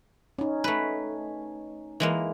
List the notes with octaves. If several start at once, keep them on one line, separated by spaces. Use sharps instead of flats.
C#4 D#4
A3 B4
E3 G#3 A#3